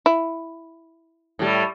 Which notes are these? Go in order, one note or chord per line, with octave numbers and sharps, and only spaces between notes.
E4
A2 G3